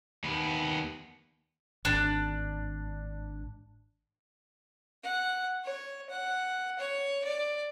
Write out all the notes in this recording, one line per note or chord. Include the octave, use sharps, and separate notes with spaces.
D#2 B3
G#1 D4
F#5
C#5
F#5
C#5
D5